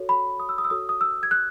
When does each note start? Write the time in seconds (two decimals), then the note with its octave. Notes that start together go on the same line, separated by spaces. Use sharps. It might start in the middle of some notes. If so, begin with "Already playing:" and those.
Already playing: F#4 A4 C#5
0.09 B5
0.40 D#6
0.49 E6
0.58 D#6
0.64 E6
0.70 F#4 A4 C#5 D#6
0.89 D#6
1.01 E6
1.23 G#6
1.31 F#6